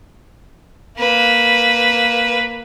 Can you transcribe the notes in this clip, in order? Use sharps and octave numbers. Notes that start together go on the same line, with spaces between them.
A#3 B4